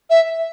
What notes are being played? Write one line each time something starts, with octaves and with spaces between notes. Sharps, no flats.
E5